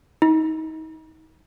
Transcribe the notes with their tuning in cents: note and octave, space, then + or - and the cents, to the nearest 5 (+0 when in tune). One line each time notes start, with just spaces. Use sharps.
D#4 +30